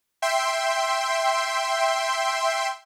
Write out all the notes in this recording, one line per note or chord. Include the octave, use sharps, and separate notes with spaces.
E5 G5 C6